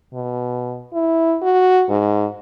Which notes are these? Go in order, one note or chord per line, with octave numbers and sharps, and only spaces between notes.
B2
E4
F#4
G#2